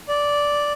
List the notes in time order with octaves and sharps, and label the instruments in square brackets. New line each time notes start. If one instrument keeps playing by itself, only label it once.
[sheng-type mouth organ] D5